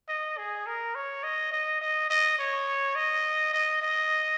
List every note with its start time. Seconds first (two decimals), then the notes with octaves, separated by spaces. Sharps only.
0.09 D#5
0.37 G#4
0.66 A#4
0.95 C#5
1.23 D#5
1.52 D#5
1.81 D#5
2.10 D#5
2.39 C#5
2.95 D#5
3.53 D#5
3.82 D#5